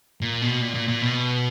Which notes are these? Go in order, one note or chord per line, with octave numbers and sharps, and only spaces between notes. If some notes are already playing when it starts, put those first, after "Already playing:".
A#2
B2
A#2
A#2
A#2
B2